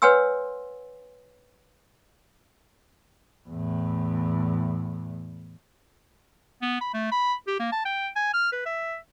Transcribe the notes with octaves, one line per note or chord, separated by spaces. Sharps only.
B4 C#5 F#5 G#5 C6 E6
E2 A2
B3
B5
A3
B5
G4
A#3
A5
G5
G#5
F6
B4
E5